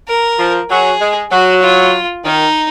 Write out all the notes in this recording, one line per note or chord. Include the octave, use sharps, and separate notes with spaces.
A#4
F3
F#3 G#4
G#3
F#3 F#4
F4
D#3 D#4